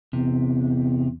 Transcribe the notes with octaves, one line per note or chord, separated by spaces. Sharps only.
E2 C3